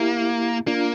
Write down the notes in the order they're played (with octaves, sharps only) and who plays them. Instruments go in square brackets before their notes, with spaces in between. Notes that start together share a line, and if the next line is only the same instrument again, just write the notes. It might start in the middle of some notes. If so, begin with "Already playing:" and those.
Already playing: [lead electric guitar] A#3 [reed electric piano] E4 G4
[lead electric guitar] A#3 [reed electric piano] D4 F4